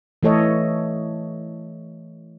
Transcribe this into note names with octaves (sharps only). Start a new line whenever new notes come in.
E3 A3 A4 C#5 D#5